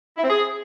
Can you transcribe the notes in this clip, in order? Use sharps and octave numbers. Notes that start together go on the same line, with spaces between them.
E4
C4
G#4